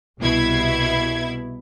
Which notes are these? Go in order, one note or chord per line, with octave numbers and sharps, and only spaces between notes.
C2 B2 E4 G#6